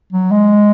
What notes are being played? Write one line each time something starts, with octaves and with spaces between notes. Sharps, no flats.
F#3
G#3